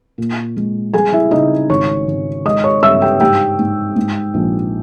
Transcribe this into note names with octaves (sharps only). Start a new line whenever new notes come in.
A#2
G#3
G3 G#4 G#5
E4 E5
C#3 D#4 D#5
G#1 C#5 C#6
G#1
G#3 D#5 D#6
C#5 C#6
G2 E5 E6
G4 G5
G#2 G4 G5
G#2
G#2
A#1